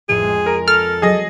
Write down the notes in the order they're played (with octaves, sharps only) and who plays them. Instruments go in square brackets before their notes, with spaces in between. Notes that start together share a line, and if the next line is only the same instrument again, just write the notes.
[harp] A1 F2 C6 [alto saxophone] G#4
[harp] G#3
[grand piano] A#4
[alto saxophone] A4 [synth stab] F6
[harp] F#3 [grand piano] G#4 D#5